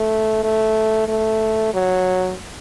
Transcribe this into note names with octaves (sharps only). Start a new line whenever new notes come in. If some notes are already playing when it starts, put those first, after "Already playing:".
Already playing: A3
A3
A3
F#3